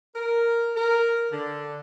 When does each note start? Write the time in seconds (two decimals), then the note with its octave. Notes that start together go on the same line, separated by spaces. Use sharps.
0.15 A#4
0.76 A#4
1.32 D3